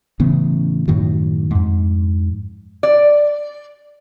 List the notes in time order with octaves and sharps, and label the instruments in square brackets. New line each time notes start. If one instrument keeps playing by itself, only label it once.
[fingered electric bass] A1 C#3 B3
F#2 A2 D#3 F#3
F2 G#2
[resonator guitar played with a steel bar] D5